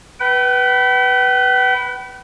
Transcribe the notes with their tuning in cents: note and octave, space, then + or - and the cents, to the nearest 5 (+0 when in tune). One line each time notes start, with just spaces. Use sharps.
B4 +0 G5 -45